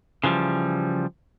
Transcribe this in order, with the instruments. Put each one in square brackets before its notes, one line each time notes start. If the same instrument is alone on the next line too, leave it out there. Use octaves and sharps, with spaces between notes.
[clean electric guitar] C#3 E3 F3 G3